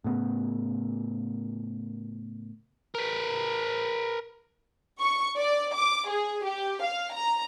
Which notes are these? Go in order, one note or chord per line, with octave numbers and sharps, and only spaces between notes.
A2 C#3 B3
A#4 B4
C#6
D5
D6
G#4
G4
F5
A#5